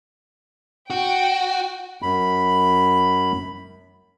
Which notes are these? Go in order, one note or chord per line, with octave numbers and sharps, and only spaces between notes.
F#4 G5
F#2 B5